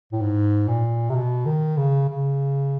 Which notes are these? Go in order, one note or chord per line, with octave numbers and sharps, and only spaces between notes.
A2
G#2
A#2
C3
B2
D#3
C#3
C#3